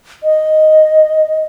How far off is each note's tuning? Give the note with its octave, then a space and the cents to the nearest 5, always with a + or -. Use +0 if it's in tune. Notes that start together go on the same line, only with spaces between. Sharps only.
D#5 +0